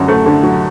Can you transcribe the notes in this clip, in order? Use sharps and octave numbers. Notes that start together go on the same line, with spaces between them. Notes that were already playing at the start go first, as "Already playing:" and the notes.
Already playing: F#2 D3 F#3
A3
D3
F#3